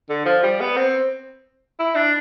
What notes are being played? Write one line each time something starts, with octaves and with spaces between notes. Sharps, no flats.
D3
F3
G3
B3
C4
E4
D4